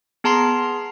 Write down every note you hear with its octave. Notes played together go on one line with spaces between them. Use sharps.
B3 G#4 A5 A#5 C6 C7